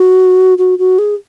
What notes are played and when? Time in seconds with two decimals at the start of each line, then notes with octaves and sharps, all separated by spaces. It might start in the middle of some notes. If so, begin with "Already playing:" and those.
Already playing: F#4
0.58 F#4
0.78 F#4
0.98 G#4